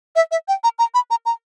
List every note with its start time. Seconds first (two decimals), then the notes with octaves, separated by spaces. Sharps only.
0.16 E5
0.31 E5
0.48 G5
0.64 A#5
0.79 A#5
0.94 B5
1.11 A#5
1.26 A#5